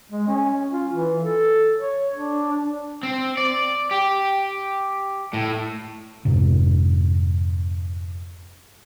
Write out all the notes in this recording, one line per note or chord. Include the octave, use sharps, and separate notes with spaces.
G#3
C#4
F4
E3
A4
C#5
D4
C4
D5
G4
A2
F2 G#2 C3